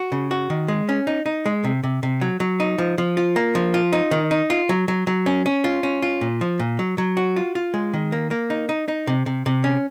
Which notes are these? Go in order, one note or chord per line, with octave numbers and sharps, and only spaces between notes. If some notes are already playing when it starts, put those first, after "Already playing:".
Already playing: F#4
C#3
F#4
D#3
G#3
C#4
D#4
D#4
G#3
C3
C3
C3
F#3
F#3
D#4
F3
F3
F4
A#3
F3
F4
D#4
D#3
D#4
F4
F#3
F#3
F#3
C#4
C#4
F4
C#4
F4
A#2
F3
A#2
F#3
F#3
F#4
F4
F4
G#3
D#3
A#3
A#3
D#4
D#4
D#4
C3
C3
C3
C#4